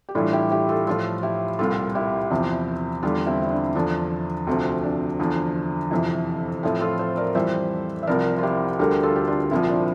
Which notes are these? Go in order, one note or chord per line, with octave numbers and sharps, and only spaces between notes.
G4
A2 E3 G3 D4 F4
E4 G4
E4 G4
F4 A4
A2 F3 F4 A4
E4 G4
C2 A#2 G3 F4 A4
E4 G4
E2 C3 F3
E2 D3 G3 D4 F4
C4 E4
E4
D4
E2 D3 F3 D4
D2 C3 F3 C4
D4
E2 D3 F3
F2 C3 E3
A2 F3 C4 E4
F4 A4
A4 C5
A#4 D5
F2 E3 G3 C5 E5
E5
C2 C3 F3 A#4 D5
F4
E4 G4
D2 D3 G3 G4 A#4
F4 A4
G4
D4 F4
C2 A#2 F3 C4 E4
D4